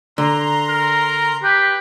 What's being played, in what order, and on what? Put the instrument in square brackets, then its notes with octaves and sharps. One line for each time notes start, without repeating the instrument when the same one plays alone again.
[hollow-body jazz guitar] D3 [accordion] A#5 C6
[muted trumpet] A#4
[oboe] G4 [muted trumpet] B4